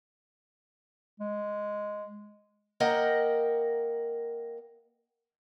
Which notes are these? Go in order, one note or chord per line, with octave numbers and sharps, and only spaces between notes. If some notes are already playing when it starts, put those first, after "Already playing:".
G#3
A#3 A#4 D#5 F#5 G5